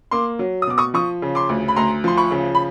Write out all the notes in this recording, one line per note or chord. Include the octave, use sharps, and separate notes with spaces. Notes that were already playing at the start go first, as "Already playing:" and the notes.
A#3 C6 D6
F#3
D#6
B2 D6
C#6 D#6
F3 C#6 D#6
C#3
C6 D6
D2
B5
D2 A#5 C6
F3 C6
B5 C#6
C#3
B5